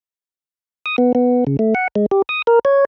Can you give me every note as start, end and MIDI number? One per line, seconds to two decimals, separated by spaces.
0.86 0.96 87
0.98 1.12 59
1.15 1.44 59
1.47 1.57 49
1.59 1.74 57
1.75 1.88 78
1.96 2.06 56
2.11 2.22 67
2.29 2.42 87
2.47 2.59 70
2.65 2.85 73